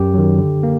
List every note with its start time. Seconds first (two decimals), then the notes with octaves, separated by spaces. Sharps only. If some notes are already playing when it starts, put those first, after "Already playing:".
Already playing: F#2 G4
0.14 D#3 F#3
0.39 D3
0.63 A#3